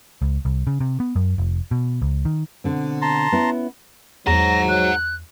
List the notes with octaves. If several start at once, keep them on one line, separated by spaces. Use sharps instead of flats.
C#2
C2
C#3
C3
B3
F#2
F1
B2
C#2
D#3
B2 D3 C4
A5 A#5 C6
B3 C#4 E4
E2 G#2 F#3 F#5 A#5 A#6
F#6